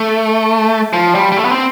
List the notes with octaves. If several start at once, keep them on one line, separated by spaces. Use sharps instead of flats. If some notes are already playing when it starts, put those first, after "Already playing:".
Already playing: A3
F3
G3
G3
A3
B3
C4